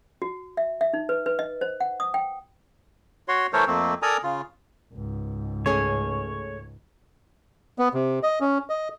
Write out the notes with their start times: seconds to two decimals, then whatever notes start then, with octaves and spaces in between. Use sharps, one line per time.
0.22 F#4
0.57 E5
0.81 E5
0.93 D#4
1.09 B4
1.26 B4
1.39 D#5
1.61 C5
1.80 F#5
2.00 D#6
2.14 G5
3.28 F#4 C#5 C6
3.53 E3 A3 A4 A#4 C5 C#5
3.67 F2 A3 A#3 C4
4.02 A4 A#4 D5 G#5 A#5 D#6
4.23 C#3 F4
4.94 C#2 G#2
5.66 A3 C#4 G#4 C#5
7.79 B3
7.94 C3
8.23 D#5
8.41 C#4
8.70 D#5